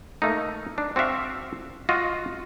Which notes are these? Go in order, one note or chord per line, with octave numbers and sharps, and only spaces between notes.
A3 A#3 D#4
D4
C4 F#4 D5 E5 F5
F4 F#4 D#5 F#5